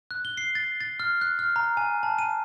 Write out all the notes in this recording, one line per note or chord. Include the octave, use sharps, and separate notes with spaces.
F#6
G7
C7
A6
A6
F6
F#6
F6
A#5
G#5
A5
D#7